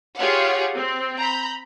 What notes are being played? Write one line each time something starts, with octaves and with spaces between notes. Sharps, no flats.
F4 G4 G#4 C#5 F5 F#5
C4
A#5 B5 G6